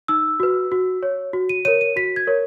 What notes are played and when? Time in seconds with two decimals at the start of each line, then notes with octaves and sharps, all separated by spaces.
0.08 D#4 E6
0.40 F#4 B4
0.72 F#4
1.03 C#5
1.33 F#4
1.49 D#7
1.65 A#4 C#5 D#7
1.81 D#7
1.96 F#4 B6
2.16 G#6
2.27 A#4 C#5